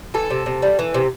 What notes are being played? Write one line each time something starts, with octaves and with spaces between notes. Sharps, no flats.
E3 A4
C3
C3
G3
E3
C3